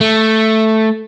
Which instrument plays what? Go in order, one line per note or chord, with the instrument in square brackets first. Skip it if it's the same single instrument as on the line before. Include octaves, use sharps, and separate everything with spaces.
[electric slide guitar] A3